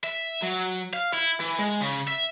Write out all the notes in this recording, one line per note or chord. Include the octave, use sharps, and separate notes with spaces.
E5
F#3
F5
E4
E3
G#3
C#3
E5